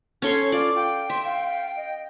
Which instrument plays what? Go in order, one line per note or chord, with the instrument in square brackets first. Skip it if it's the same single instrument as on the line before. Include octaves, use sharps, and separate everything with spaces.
[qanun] C#4 A4 C6 [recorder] C#5
[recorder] F4 [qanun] D5
[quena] F5 [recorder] G5
[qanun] E5 [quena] C6
[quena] F5
D#5